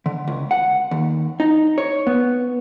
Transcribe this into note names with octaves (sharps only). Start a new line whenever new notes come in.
D3
C#2
F#5
D#2
D#4
C#5
B3